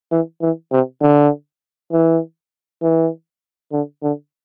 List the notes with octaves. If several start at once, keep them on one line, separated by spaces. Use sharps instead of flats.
E3
E3
C3
D3
E3
E3
D3
D3